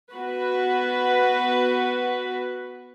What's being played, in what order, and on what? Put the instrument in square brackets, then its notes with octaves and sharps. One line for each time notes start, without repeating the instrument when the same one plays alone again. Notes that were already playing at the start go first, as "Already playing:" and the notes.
[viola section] B3 F#4 B4